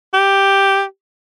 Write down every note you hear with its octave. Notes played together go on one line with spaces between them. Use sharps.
G4